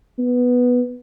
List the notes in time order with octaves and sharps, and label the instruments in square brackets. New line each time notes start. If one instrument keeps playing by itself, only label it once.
[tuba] B3